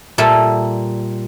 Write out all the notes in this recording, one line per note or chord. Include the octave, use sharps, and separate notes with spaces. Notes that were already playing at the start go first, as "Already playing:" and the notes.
A#2 G3 A4 E5